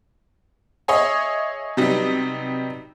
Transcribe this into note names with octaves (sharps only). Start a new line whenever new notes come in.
G#4 C#5 D#5 E5
C3 F#3 G3 B3 D#4